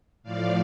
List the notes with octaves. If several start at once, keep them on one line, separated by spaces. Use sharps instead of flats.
A2 F3 D5 F5